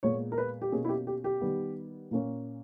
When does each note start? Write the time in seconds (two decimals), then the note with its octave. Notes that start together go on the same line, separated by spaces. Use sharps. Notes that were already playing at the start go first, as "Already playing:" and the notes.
0.03 A#2 G#3 B3 C#5
0.32 A#4
0.38 B4
0.62 G4
0.72 B2 A#3 C#4 G#4
0.85 E4
0.89 G4
1.07 G4
1.24 G4
1.41 D#3 G3 B3
2.11 A#2 A#3 C#4